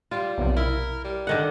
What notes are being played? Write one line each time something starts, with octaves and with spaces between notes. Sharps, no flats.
G3 F4
B1 F2 C3
E4 A#4
G3
D3 D#3 F#5